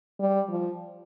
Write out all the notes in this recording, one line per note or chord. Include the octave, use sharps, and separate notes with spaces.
G3
F3